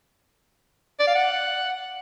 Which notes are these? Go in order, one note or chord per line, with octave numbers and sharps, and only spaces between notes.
D5
F5
F#5